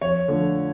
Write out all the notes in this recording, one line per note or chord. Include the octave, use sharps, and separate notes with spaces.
F2 C#5
D3 F3 A3